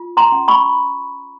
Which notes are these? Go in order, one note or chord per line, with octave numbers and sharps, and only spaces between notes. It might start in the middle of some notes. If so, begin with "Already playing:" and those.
Already playing: F4
A#5 C6
C#4
B5 C#6